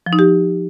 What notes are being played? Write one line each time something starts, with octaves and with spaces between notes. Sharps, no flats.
F3
D#4
G4